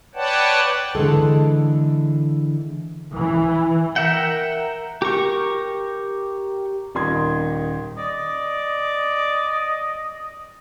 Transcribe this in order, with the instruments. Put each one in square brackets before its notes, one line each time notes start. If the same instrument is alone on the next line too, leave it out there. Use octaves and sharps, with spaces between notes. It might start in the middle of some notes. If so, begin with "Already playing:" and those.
[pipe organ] B4 C#5 D5 F#5 G5 A5
[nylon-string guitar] D3 E3 G#3 A4
[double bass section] E3
[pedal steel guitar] A#4 E5 F#5 G5
G4 A#4 C#6
[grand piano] D#1 D#3 C6 G#6
[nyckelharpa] D5 [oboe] D#5